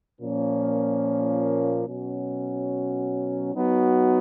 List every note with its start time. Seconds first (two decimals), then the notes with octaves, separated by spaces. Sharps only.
0.20 A#2 F3 A#3 C#4
1.87 B2 F#3 C#4 F#4
3.54 F#3 B3 D#4 F#4